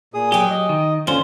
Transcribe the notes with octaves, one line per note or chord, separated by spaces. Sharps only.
A#2 G#4 D#6
F#3 G4 G5 G#5
D#5
D#3
D#2 D3 C#4 F4 C5